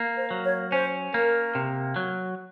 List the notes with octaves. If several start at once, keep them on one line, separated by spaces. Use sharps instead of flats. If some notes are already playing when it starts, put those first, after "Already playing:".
Already playing: A#3
C5
F#3
C#5
C#4 C5
A#3 A#4
C3
F#3